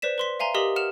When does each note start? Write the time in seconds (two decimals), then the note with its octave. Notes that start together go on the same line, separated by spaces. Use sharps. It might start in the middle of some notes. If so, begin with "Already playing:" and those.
0.02 B4 C5 D5 B6 E7
0.18 B4 C6 B6
0.40 E5 F5 G#5 A#5 C6
0.54 G4 A#4 D#5 D#6 B6 F#7
0.76 F#5 F6 E7 F7